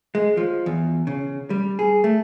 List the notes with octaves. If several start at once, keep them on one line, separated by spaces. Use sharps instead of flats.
G#3
F3
E2
C#3
G3
G#4
A3